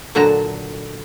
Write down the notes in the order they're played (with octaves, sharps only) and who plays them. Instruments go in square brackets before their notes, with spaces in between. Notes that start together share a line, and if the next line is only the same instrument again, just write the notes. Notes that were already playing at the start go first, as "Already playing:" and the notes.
[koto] A#2 D3 F#3 A5 A#5